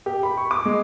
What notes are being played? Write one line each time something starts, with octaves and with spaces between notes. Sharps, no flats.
G4
B5
C#6
D6
G#3